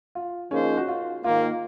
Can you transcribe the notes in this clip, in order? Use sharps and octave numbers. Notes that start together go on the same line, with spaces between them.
F4
F3 A#3 C#4 D#4 G#4 C5
F#4
F4
G#2 D#3 A#3 F4